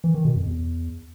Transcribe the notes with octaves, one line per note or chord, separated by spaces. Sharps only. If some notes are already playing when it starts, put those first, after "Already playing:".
E3
D#3
B2
F2
E2